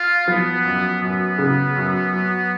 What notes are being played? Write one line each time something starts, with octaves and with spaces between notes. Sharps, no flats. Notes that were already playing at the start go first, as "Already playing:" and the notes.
Already playing: F4
F3 B3
F#2
F#2 B3
C#3
F#2
F#3